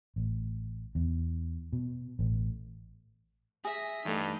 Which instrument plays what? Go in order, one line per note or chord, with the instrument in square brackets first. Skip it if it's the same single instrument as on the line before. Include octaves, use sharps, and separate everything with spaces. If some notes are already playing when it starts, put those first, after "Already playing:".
[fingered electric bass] A1
E2
B2
A1
[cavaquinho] G#4 E5 [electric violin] A#6 B6
[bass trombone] G2 [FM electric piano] E3 A3 [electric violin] D#4